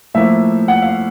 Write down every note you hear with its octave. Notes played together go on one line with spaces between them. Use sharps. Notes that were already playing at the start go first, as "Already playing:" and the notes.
A2 F3 A#3 E5
F#5
F5